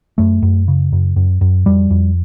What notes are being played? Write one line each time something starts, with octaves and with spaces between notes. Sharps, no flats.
F#2 A3
F#2
C#3
F#2
F#2
F#2
F2 G3
F2